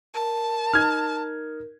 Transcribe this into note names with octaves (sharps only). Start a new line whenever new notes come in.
A#4 A5
D#4 F6 G#6